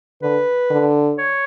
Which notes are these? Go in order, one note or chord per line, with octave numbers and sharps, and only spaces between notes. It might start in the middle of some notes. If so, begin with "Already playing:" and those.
D3 B4
D3
C#5